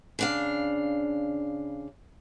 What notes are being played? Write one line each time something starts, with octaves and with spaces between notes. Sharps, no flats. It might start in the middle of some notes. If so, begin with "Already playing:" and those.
C#3 D4 F5